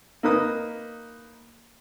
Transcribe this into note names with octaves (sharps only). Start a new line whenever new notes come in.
A#3 D#4 B4 D#6